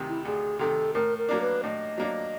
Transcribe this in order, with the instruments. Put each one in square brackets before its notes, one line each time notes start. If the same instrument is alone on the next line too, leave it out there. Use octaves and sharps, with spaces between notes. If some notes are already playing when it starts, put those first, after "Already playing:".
Already playing: [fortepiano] D2 C3 D#3
[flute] E4
[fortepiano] D2 [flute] G#4
[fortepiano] C3 D#3 [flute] A4
[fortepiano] A2 [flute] A#4
[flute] A#4
[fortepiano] F#3 A#3 D4
[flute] B4
[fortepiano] A2 [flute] D#5
[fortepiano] F#3 A#3 D4